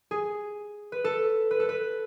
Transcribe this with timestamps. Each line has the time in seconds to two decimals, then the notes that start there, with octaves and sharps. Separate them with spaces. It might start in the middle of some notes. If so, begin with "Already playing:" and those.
0.11 G#4
0.92 B4
1.04 A4
1.51 B4
1.60 A4
1.69 B4